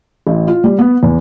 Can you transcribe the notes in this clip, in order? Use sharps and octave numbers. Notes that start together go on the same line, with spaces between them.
A1
F4
G3
B3
E2